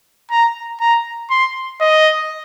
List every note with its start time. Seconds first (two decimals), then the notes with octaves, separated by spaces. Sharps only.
0.31 A#5
0.80 A#5
1.30 C6
1.81 D#5